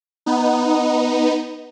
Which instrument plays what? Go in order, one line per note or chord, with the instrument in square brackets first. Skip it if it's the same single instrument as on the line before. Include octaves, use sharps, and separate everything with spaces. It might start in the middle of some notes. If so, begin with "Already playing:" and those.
[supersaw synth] B3 D#4